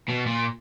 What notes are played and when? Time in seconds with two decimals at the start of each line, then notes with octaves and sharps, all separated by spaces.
0.08 B2
0.26 A#2